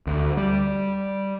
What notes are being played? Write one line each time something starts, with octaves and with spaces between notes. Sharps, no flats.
D2
G3